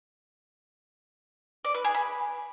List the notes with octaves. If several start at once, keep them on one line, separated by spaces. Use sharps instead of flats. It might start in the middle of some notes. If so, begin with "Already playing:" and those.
D5
B4
G#4
B5